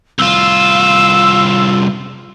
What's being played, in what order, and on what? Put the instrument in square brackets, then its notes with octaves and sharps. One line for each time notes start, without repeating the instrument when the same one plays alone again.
[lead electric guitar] C2 F4 [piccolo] E6